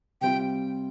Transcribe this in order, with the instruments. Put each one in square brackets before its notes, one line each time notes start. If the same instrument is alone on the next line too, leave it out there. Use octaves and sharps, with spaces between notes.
[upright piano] C3 G3 C4 F4 [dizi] G5